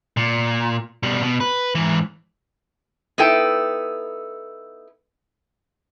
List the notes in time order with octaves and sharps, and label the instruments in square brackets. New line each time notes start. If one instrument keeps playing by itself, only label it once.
[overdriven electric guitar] A#2
B2 G3
B2
B4
G#2 E3
[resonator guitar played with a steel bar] B3 D#4 E4 A4 G5